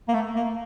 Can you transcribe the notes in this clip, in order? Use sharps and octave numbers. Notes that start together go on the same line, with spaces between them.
A#3
A3
A#3